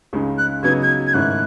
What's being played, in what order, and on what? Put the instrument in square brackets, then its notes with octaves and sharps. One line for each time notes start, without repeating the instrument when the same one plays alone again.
[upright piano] C#2 C#3 G#3 D#4
[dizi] F#6
[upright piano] C#3 F#3 B3 D#4 [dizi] G#6
[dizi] G#6
G#6
[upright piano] G#2 D#3 A3 C#4 E4 [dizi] F#6